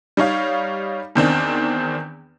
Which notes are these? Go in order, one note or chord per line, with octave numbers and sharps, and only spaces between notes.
G3 D#4 C#5 F5
E2 D#3 C4 D4